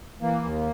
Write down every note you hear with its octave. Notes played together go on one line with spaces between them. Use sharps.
E3 A#3
D#2